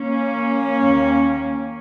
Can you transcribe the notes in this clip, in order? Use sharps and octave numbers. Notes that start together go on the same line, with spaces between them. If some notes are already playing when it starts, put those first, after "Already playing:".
Already playing: A#3 C#4
D#2 D#3